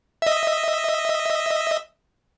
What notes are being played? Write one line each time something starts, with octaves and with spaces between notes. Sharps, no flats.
D#5 E5